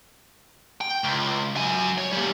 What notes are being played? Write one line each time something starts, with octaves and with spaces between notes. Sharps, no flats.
G5
C#2
F#3 G#5
C#5
G3 A#3